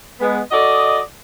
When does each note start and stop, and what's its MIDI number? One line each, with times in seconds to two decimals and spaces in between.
0.20 0.39 56
0.20 0.39 59
0.51 0.99 66
0.51 0.99 69
0.51 0.99 74
0.51 0.99 75